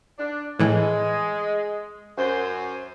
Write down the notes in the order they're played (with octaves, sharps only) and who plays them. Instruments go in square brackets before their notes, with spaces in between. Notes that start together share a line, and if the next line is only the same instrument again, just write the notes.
[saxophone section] D4
[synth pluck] A2 E3 [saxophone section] G#3
[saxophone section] F#2 C5